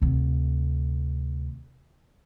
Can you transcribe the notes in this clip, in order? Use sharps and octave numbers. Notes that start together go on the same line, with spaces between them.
D2 C3